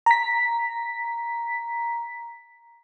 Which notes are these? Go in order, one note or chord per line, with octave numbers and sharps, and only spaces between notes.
A#5 B6